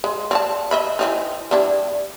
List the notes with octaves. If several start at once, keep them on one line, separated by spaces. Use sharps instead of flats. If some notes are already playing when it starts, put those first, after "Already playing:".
G#3
C4 D5 A5
D#5 E5 B5
E3 C4 D#4
G3 D4 E4